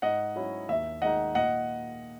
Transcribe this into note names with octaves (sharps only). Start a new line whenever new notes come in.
G#2 D#5 F#5
F#3 C#4 E4
D#2 E5
D#3 G#3 D#4 D#5 F#5
A#2 D#5 F#5